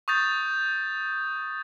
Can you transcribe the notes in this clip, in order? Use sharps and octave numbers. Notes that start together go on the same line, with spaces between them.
C#6 D#6 G6 A6